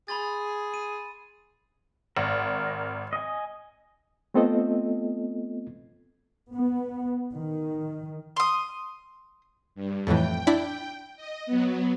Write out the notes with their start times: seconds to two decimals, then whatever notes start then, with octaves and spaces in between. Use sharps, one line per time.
0.08 G#4 B5 C6 A6
0.74 D#7
2.17 G#1 A#4
3.13 D#5 G#5
4.34 A3 B3 C4 F4 A4 D#5
6.51 B3
7.34 D#3
8.36 C6 D#6
9.75 G2
10.07 F2 A2 E3 G5
10.47 D4 E4 B5
11.17 D#5
11.46 F#3 B3